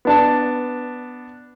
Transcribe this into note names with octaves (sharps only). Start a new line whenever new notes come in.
B3 D4 A5